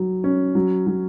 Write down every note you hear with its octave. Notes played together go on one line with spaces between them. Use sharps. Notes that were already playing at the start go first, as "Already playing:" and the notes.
Already playing: F#3
C#4
F#3
F#3